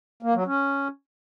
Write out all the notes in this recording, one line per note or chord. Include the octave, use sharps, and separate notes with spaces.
A#3
F#3
C#4